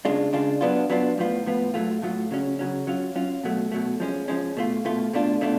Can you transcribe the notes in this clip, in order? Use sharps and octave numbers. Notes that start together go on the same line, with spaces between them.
C#3 G#3 D4 F4
C#3 G#3 D4 F4
F#3 B3 D4 F4
F#3 B3 D4 F4
A2 F3 B3 F4
A2 F3 B3 F4
A2 F#3 A3 F4
A2 F#3 A3 F4
C#3 F#3 C#4
C#3 F#3 C#4
F#3 C#4 F4
F#3 C#4 F4
B2 F#3 A3
B2 F#3 A3
F3 G#3 C#4
F3 G#3 C#4
B2 A3 F4
B2 A3 F4
B2 A3 D4 F4
B2 A3 D4 F4